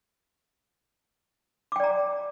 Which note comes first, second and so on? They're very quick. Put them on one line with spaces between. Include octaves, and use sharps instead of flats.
D6 G5 D5 A#5